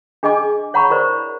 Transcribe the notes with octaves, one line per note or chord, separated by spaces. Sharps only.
D4 G#4 D#5 G#5 D6
C#5 F#5 A#5 B5 C#6
E4 A#4 C5 D5